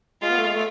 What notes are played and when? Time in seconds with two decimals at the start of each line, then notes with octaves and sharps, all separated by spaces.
0.22 G#3 F4
0.30 B3
0.38 A3
0.47 G#3
0.55 A3